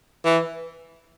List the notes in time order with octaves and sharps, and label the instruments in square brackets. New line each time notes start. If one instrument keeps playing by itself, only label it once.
[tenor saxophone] E3